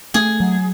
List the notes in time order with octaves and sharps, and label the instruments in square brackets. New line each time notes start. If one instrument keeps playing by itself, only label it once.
[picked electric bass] A3 [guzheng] G#4
[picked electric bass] F#3